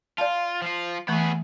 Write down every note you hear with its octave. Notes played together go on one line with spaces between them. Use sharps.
F4 D5 F5 A5
F3 F4
E3 A3 B3 G#4 C#6